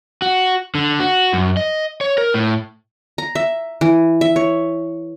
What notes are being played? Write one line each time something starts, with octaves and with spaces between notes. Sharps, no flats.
F#4
D3
F#4
F#2
D#5
C#5
A#4
A2
A#5
E5
E3
E5
C#5